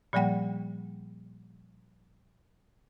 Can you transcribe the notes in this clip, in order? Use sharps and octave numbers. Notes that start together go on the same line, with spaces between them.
A#2 F3 G3 A#3 F#5 G5